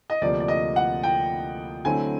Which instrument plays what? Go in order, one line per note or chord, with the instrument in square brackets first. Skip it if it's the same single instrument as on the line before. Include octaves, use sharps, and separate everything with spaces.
[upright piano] D#5
[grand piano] D2 C3 F3 A#3 [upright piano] D5
[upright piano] D5
D#5
F#5
G5
[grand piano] D3 F#3 A3 C4 E4 [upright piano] G#5